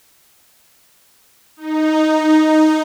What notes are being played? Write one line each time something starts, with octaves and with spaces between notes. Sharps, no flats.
D#4